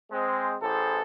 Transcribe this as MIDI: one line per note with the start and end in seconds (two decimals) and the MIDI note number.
0.11 0.54 56
0.11 0.54 60
0.61 1.02 33
0.61 1.02 52
0.61 1.02 68
0.61 1.02 69
0.61 1.02 72